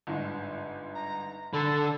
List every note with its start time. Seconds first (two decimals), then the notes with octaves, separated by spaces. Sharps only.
0.07 G1 G#2
0.95 A#5
1.53 D3 A4 B5